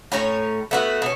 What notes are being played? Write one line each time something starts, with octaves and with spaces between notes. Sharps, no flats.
A2 C#4 C#5 A#5
A3 B3 F#4
B2 C#4